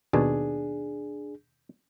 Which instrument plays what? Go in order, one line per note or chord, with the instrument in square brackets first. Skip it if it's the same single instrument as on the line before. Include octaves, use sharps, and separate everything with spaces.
[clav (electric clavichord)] D#2 B2 [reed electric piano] D4 G#4